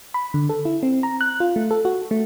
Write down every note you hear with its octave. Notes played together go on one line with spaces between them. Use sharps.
B5
D3
A4
E4
C4
A#5
F#6
F4
A3
A4
F#4
A3